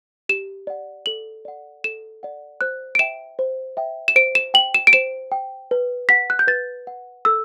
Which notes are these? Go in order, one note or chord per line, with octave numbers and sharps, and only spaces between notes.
G4 E7
D5 F#5
A4 F#7
D5 F#5
A4 E7
D5 F#5
C5 F#6
D7
E5 G5 E7
C5
E5 G5
E7
C5 D7
E7
G5 F#7
E7
D7
C5 E7
G5
B4
F#5 B6
F#6
G6
B4 A6
F#5
A4 E6